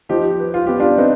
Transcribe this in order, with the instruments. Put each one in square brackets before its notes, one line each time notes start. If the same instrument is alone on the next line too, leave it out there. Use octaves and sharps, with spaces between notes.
[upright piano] F3 [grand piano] D#4 G4
[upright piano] B4
[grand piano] F4
[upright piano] B3 [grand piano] G4
[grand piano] D4 F4
[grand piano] C4 D#4 [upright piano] B4